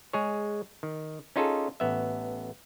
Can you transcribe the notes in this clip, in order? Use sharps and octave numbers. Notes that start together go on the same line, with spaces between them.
G#3 G#4 C#5
D#3
C#4 D#4 F4 G#4 A4
A1 B3 E5